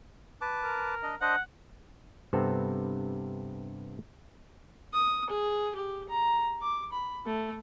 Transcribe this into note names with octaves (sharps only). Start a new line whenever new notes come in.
B4 A5 D6
A#4
D4 D#5
D4 C5 D#5 F#5
G2 C3 B3 C4 A4
D#6
G#4
G4
A#5
D6
B5
A3